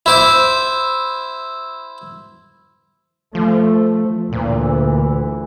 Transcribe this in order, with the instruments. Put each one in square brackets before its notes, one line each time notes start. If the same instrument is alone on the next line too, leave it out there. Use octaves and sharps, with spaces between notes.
[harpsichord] E4 C5 D6
[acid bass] F3 [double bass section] A3
[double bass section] D2 E3 [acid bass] A#2